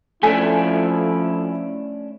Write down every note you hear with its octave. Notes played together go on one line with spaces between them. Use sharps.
F3 A3 C#4 D4 E4 A4 G#5 B6